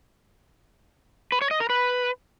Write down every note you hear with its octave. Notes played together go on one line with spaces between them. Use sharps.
B4
C#5
D#5
A#4
B4